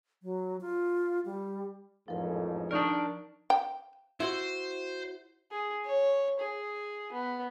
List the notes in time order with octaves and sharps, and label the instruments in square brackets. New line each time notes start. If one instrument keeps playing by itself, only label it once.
[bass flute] F#3
F4
G3
[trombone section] A1 F2 G#2 [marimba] F3 A#4
[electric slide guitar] D4 D#4 A#4 [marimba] D5 C#6 D#6
[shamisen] G5
[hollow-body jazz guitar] E4 F#4 C6 [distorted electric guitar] C5
[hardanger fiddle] G#4
C#5
G#4
B3